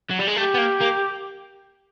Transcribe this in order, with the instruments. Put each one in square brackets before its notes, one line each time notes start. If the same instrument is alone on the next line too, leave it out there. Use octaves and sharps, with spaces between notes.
[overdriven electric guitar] F#3
G3
G#3
[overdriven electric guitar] A3 [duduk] G4
[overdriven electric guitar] B3
A#3
A#3